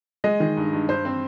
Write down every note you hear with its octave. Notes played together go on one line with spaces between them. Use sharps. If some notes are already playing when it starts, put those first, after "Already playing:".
G#3 D#5
D#3
G2
G2
G2 C5
C4